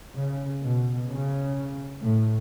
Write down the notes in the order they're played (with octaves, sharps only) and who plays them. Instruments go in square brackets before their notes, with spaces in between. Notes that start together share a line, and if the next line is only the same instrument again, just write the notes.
[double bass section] C#3
B2
C#3
A2